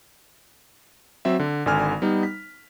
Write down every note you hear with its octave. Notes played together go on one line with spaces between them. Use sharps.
F#3 C4 E5
D3
G#1 D3 G#5 F6
G3 B3 D#4
B6